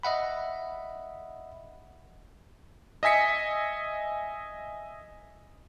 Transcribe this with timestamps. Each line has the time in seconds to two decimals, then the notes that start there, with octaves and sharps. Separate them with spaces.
0.03 D#5 E5 F#5 B5
3.03 D#5 E5 G#5 B6 C#7